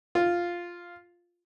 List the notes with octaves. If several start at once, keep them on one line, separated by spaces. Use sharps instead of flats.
F4